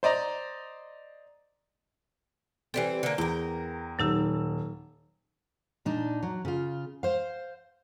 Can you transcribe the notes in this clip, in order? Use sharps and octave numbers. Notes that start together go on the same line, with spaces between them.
C5 D5 D#5 A#5
E3 G3 C4 A4 B4 C5
D3 A#3
E2 A#4 G5
D#1 F#3 D#4 G4 E6
A#2 D4 D#4
F#3
C#3 F4
C5 F5